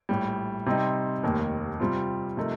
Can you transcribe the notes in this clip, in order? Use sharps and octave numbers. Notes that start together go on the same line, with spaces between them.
A#1 A2 G3
C3 G3 C4 D#4
F1 D#2 D#3 A#3
C3 G3 C4 F4
C3 F3 A3 D#4 A#4